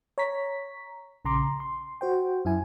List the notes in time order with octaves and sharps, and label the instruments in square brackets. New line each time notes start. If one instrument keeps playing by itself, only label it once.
[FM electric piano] C#5 A#5 B6
A#1 C#3 A#5 C6 D6
C6
F#4 C5 G5
F#2 E4 G#5